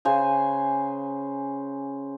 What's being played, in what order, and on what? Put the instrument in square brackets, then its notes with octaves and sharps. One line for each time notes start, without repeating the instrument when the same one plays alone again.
[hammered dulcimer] C#3 C5 G#5